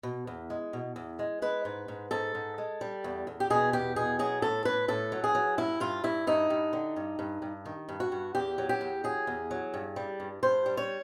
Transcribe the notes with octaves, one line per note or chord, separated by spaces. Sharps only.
B2
E2
G#3
B2
E2
G#3
G#3 B4
G#2
G#2
G#2 A4
G#2
G#3
G3
E2
E2
G4
B2 G#4
E2 G4
B2 G#4
F#3 G#4
A2 A4
A2 B4
A2 A4
F#3
G#4
F#3
G2 E4
G2 F4
G2 E4
G2 D#4
G2
D3
G2
G2
G2
D#3
G2
F#4
G2
E2 G4
F#3
G4
E2
F#3 G#4
E2
F#3
G2
G3
G2
G2 C5
G3
C#5